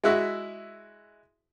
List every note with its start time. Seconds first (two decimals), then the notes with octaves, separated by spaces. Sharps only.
0.04 G#3 E4 F#4 E5